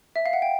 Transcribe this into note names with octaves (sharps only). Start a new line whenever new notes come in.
E5
F5
F#5
G5